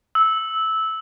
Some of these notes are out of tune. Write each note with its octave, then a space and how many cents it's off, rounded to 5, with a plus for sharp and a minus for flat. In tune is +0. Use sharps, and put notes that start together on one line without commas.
E6 -15